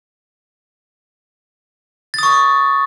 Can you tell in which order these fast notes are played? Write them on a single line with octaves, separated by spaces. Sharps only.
A6 D#6 C#6